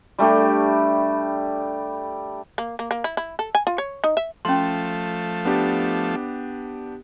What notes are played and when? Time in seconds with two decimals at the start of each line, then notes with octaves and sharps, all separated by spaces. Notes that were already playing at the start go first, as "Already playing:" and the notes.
0.18 G3 A3 D4 G4
2.58 A#3
2.79 A#3
2.91 A#3
3.04 E4
3.17 E4
3.39 A4
3.55 G#5
3.67 F4
3.78 C#5
4.04 D#4
4.17 E5
4.45 F3 A3 C#4 C6
5.45 B3 D4 G4